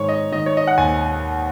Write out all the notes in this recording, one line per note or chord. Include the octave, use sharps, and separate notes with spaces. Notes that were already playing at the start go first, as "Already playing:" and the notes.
Already playing: G#2 D#3 C#5
D#5
D#3 D#5
C#5
D#5
F#5
D#2 G#5